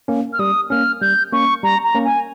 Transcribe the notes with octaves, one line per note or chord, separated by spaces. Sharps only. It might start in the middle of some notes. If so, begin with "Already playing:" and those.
A#3 C#4
F6
G3 D#6
A#3 C#4 F6
G3 G6
A#3 C#4 C#6
G3 A#5
A#5
A#3 C#4
G#5